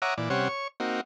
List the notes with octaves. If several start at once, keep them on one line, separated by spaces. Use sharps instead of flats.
C#5 E5 F#5 A#5 D6 D#6
A#2 E3 D5
C3 G3 C#4 C5 C#5 F#5
C#5 C#6
A#3 C4 D#4 F#4